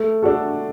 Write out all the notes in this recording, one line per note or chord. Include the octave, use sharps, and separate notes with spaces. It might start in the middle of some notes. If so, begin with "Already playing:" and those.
Already playing: A3
D4 F#4 A4